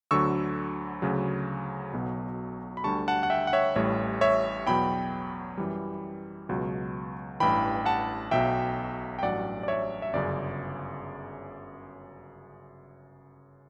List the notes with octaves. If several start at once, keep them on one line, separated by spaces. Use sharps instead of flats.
D2 D3 F#3 C#6 E6
D2 C#3 F#3
B1 B2 F#3
B5
D2 D3 G3 A5 C#6
F#5 A5
F#5
E5 G5
F#5
C#5 E5
A1 A2 G3 C#5
C#5 E5
E2 B2 F#3 G5 B5
F#2 E3 G3
C#2 B2 F#3
A1 G2 E3 G5 B5
F#5 A5
B1 B2 F#3 E5 G5
G5
A1 G2 F#3 D5 F#5
D5
C#5 E5
E5
G1 F#2 C#3 D5